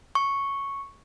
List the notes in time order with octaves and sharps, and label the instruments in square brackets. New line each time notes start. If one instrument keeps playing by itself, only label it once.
[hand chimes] C#6